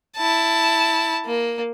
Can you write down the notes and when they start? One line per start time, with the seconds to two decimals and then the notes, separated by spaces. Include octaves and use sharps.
0.17 E4 A5
1.26 A#3